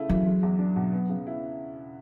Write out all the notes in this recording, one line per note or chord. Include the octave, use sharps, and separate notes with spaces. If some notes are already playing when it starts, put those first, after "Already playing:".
Already playing: C#3 A3 E4
E3 F#3
G#3
E2
D4
B2
B3
C#3
E4